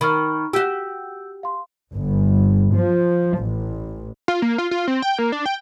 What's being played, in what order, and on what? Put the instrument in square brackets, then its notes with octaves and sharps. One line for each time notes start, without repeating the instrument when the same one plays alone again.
[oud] D#3 [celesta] B5 C#6 F6
[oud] F#4 G4 [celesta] E6 G6
[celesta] F5 C6
[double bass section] G1
F3
A1
[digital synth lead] F4
A#3
F4
F4
C4
G5
A#3
D4
G5